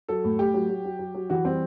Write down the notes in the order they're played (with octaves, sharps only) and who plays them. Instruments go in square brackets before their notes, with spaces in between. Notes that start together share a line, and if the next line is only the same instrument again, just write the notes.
[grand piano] F#3 A4
A2
A2 G4
F#3
F#3
F#3
F#3
F#3
E3 F#4
G3 C4